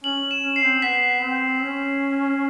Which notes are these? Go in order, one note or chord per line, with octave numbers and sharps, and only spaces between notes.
C#4 F#7
E7
C#4
C7
C4
B3 B6
C4
C#4